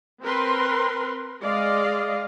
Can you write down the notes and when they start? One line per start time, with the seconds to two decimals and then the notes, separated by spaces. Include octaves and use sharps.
0.23 C4 A#4 B4 C6
1.41 G#3 D5 D#5 F5